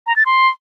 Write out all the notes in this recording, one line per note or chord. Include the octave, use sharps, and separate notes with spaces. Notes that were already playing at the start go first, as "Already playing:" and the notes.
A#5
A6
C6